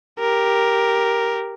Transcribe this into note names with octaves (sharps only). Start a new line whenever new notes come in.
G4 A#4